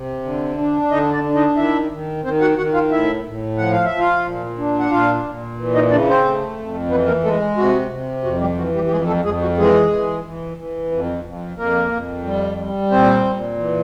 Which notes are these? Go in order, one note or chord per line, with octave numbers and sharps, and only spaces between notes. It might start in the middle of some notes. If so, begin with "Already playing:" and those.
Already playing: C3
D3
D4
D3 D#4 D#5
D4 D5
D4
D#4 D#5
D#3 E4 E5
D#3
D#3 C4 C5
F#4 F#5
D#3 F#4 F#5
F4 F5
A2 E4 E5
A2
F3 F#5
F5
F3 E5
F4 F5
A#2
D4
F#5
A#2 F4 F5
A#2
E3
D#4 D#5
C#3 D4 D5
C4 C5
A3
F2
E3 B3 B4
A#3 A#4
G#3 A3 A4
C3 F#4
C3
F2 F#4
G3 G4
E3 F#4
G3 G4
G4
F2 G#3 G#4
A3 A4
F2 G#3 G#4
F#4
E3 G#3 G#4
E3
E3
E3
F2
F2
F2 A#3 A#4
F2
G3
G3
A#2 C4 C5
A#2
E3